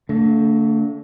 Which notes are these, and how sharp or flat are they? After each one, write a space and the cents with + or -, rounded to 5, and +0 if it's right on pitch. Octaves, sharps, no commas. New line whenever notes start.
D3 -30 A3 +30